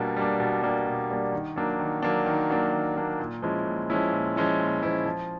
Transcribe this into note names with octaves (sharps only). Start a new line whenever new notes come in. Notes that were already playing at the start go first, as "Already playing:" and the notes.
Already playing: B2 G3 A#3 D4
G3 A#3 D4
B2
G3 A#3 D4
B2
G3 A#3 D4
D#3
F#3 A#3 D4
D#3
F#3 A#3 D4
D#3
F#3 A#3 D4
D#3
F#3 A#3 D4
A#2
F3 G#3 C#4 E4
A#2
F3 G#3 C#4 E4
A#2
F3 G#3 C#4 E4
A#2
F3 G#3 C#4 E4
F3